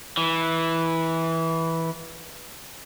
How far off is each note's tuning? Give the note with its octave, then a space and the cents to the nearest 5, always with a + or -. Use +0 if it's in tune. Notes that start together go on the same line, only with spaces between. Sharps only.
E3 -10